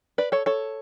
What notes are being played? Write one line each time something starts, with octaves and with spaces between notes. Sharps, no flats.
B4 D5
A4 C#5
A4 C#5